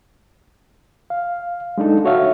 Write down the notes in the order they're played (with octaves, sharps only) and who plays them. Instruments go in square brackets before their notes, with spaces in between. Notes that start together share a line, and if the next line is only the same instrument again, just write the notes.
[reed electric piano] F5
G#3 D4 D#4 A4
F#4 C#5 E5 F5